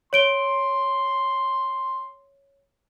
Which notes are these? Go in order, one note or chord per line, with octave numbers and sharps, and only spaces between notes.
C#5 C6 D7 G7